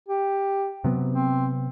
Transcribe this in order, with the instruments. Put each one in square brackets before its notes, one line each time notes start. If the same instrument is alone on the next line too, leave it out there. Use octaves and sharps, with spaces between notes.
[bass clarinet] G4
[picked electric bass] C3 F#3 B3
[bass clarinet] C4